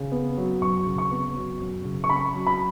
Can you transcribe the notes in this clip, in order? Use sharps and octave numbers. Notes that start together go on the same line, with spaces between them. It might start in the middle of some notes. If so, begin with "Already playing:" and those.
Already playing: C#3
B3
F#3
F#2 C#6
C#3
C#6
B3
F#3
F#2
C#3
C#6
C#4 B5
F#3
B5